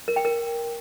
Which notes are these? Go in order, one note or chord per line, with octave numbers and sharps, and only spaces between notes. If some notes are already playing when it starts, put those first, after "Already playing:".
A#4
G5
A#4